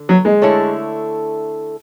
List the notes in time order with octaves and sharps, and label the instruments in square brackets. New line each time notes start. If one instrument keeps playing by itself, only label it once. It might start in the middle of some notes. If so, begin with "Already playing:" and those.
Already playing: [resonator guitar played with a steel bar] D3
[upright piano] F#3
G#3
[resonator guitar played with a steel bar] D3 A3 E4 A4 C#5